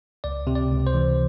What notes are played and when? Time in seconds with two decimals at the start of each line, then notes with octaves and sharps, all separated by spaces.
0.24 C#2 D5
0.47 C3
0.55 D5
0.70 C#2
0.87 C5
0.94 E3